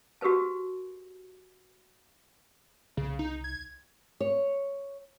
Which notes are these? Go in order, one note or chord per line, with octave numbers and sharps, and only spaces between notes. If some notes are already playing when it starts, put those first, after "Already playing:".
F#4 G4 A#4 B4 A5
C2 C#3
D#4
G#6
C#5